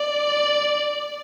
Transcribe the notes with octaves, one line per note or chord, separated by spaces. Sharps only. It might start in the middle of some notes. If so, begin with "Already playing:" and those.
Already playing: D5